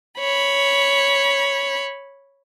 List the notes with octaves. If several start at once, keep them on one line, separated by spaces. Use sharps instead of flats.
C#5 B5